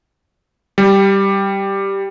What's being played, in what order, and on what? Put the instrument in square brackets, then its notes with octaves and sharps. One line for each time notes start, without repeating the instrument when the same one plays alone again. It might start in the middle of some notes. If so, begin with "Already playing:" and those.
[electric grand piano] G3